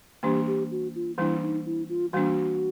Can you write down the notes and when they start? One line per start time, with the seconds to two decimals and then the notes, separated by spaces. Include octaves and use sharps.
0.23 E3 G3 A#3 D4 G4
0.47 G4
0.71 F#4
0.95 F4
1.18 E3 G3 A#3 D4 E4
1.42 D#4
1.66 E4
1.89 F4
2.13 E3 G3 A#3 D4 F#4